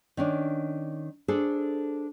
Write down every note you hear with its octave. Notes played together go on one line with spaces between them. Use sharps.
D#3 C#4 D4
D4 G#4 A4 C5